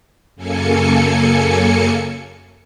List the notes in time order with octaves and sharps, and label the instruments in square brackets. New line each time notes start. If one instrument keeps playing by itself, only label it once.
[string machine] F#2 C#3 A#3 A4 G#5 C#7